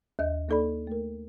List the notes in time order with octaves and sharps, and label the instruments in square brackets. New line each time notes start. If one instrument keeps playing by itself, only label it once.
[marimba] D#2 D#5 G6
D#2 A#3 D#4 A4 D5 B5
A3 A#4